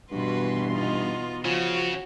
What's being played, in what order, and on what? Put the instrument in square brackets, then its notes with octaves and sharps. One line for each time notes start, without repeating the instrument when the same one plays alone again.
[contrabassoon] G2 [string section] B2 E3 C6 [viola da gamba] F#4 B4
[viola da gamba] B3 D#4 F4
[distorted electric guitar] C#3 [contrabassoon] F3 [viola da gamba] F#4